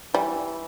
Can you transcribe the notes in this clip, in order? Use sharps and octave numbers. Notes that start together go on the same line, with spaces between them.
E3 G3